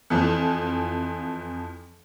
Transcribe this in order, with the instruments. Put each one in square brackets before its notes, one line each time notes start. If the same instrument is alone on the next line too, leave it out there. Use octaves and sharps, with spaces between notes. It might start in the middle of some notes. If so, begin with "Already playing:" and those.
[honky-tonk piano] F2 E3 F3